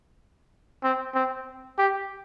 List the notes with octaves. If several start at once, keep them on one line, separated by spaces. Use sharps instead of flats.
C4
C4
G4